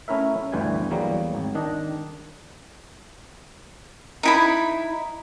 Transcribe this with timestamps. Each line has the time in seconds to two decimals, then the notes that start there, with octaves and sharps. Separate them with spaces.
0.08 A3 C#4 E4 A#4 E5
0.52 G1 D2 E3 G3 G#5
0.91 E2 F#3 G3 A#3
1.35 G#1
1.55 D#3 D4 D#5
4.23 D#4 E4 B5